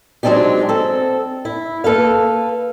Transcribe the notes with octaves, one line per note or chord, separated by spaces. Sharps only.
F#3 G#3 C4 D4 D#4 G4
C4 A4
E4
A#3 A4 B4 F5